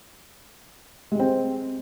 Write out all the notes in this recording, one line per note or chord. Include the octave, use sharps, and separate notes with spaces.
G#3 C4 G4